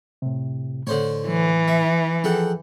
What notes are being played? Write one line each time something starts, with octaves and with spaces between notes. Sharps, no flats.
A2 C3
A2 D3 C5 C#5
E3
E5
F3 G#4 A4 F#5 G5